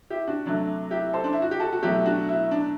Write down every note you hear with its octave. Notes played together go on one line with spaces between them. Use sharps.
E4 G4
D4 F#4
C3 F#3 A3 D4
E4 G4
A4 C5
D4
E4
F#4
G4
F#4 A4
F#4
B2 F#3 A3 E4 G4
D4 F#4
E4
D4